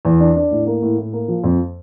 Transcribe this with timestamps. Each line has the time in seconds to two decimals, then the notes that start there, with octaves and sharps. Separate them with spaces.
0.05 E2
0.20 D4
0.36 D4
0.51 A2
0.67 A#3
0.82 A2
0.98 A2
1.13 A#3
1.28 F3
1.44 F2